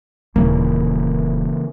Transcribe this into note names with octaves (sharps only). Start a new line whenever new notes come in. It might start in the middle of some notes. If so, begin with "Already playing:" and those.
D#1 C#3 E3 A#3